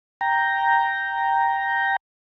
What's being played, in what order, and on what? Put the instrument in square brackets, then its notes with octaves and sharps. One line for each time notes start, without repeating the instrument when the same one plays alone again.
[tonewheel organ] G5 A#5